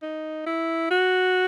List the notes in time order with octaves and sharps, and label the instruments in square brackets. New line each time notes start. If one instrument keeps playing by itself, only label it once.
[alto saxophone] D#4
E4
F#4